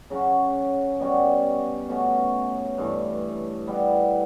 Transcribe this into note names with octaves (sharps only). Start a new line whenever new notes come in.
C#3 F#3 C#4 F#4
B2 G3 C#4 F#4
B2 A3 C#4 F#4
G2 E3 A3
B2 G3 B3 E4